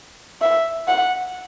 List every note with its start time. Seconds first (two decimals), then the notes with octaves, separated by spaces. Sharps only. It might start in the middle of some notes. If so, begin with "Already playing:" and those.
0.42 E5
0.88 F#5